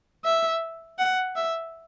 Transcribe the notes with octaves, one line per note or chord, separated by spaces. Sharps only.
E5
F#5
E5